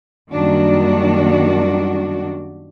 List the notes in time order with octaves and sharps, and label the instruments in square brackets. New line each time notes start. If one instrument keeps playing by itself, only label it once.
[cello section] F#2 D#3 G3 A#3 D4 F#4